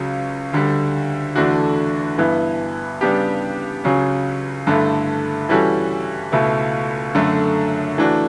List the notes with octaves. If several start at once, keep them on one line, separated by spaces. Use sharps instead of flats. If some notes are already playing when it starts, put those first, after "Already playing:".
Already playing: C#2 C#3 F#3
D2 D3 G3
E2 D3 A3 D4 F#4
G2 E3 B3 E4
C#3 G3 B3 D4 G4
C#2 C#3 F#3 C#4
G2 D3 A3 E4
E3 G3 C#4 F#4 A4
C#2 B2 A3 E4
F#2 D3 A3
E3 A3 D4 F#4